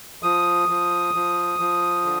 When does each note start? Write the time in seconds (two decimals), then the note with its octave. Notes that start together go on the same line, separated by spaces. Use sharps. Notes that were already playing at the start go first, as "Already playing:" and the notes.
0.23 F3 D#6
0.68 F3
1.14 F3
1.59 F3
2.05 D3